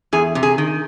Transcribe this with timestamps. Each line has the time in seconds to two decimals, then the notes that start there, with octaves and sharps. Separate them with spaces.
0.13 E2 G#4
0.35 C3
0.43 G#4
0.58 D#3